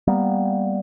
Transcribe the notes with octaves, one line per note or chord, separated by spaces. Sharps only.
G3 A#3 B3